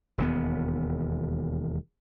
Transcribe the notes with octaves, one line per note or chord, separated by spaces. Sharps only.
E1 D#2 B3